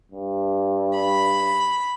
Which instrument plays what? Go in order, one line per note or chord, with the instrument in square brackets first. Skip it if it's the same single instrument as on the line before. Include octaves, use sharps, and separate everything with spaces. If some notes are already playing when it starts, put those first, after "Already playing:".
[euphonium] G2
[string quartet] B5